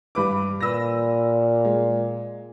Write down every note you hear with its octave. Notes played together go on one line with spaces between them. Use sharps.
G2 B4 D6
A#2 B4 E6 A#6
G#3